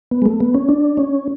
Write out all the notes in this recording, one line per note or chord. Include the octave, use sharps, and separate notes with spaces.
B3
G#3
A3
B3
C#4
D4
C#4